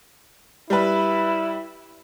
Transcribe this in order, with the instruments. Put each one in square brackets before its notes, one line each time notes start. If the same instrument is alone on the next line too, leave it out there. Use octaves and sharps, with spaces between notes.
[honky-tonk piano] G3 B4 [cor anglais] E4